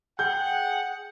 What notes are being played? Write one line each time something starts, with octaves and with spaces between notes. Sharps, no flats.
G#4 F#5 G5 G6